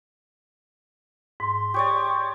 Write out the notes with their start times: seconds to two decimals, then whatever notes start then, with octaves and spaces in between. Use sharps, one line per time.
1.40 G#2 C6
1.74 G4 C#5 D5 C#6